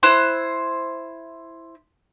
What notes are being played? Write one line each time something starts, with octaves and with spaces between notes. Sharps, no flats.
E4 C5 F#6